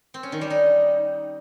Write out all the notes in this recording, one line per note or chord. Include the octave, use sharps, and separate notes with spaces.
C4
C#4
D#3
G3
D#4